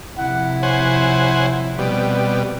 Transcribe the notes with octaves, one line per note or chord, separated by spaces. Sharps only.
C3 F3 E4 F#5
C5 C#5 F#5 G#5
B2 G3 C4 D5